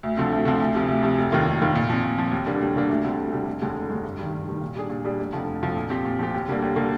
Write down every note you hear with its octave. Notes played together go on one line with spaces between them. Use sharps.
D2
D3 F3 C4
D2
D3 F3 C4
D2
C3 F3
D2
C3 F3
F1
D#2 D#3 A#3 F4
F1
D#2 D#3 A#3 F4
A#2
F3 C4
A#2
F3 C4
D#2
D3 G3 A#3 D4
D#2
D3 G3 A#3 D4
D2
D3 G3 C4
D2
D3 G3 C4
F1
D#2 D3 G#3
F1
D#2 D3 G#3
G2
D#3 G3
G2
D#3 G3
A#2
G3 D4 G#4
A#2
G3 D4 G#4
F1
F2 D3 F3
F1
F2 D3 F3
A#2
F3 C4 G4
A#2
F3 C4 G4
D#2
D3 G3 A#3
D#2
D3 G3 A#3